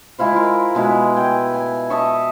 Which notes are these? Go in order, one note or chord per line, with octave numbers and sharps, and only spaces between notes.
G#3 E4 F4 C5
A#4
B2 G#3 E4 F#5
G5 G#5
G#5
D#5 E5 A5 C#6